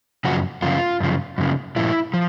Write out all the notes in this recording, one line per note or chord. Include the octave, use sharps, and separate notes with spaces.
F#2 C#3 F3 F#4
F#2 C#3 F3 F4
F#2 C#3 F3
F#2 C#3 F3
A#2 F3 E4
F3